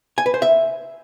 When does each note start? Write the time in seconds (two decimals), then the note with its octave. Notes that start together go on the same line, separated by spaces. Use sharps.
0.18 G#5
0.26 B4
0.34 C5
0.42 E5